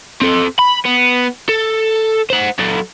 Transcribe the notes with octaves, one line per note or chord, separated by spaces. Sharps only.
C4 A4
B5
B3
A4
C5 F#5
F#3 A4